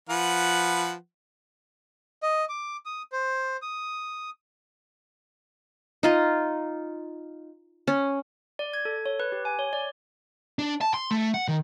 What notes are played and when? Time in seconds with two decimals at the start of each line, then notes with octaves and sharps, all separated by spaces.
0.09 F3 B4 F#5
2.22 D#5
2.49 D6
2.85 D#6
3.12 C5
3.62 D#6
6.03 D#4 F4 D#5
7.87 C#4
8.59 D5
8.73 G#6
8.85 A4
9.06 C#5
9.20 B4
9.32 G4
9.45 G#5
9.59 C#5
9.73 D5
10.59 D4
10.81 A5
10.94 C6
11.11 A3
11.34 F#5
11.48 D#3